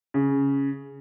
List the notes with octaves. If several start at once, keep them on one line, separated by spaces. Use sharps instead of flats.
C#3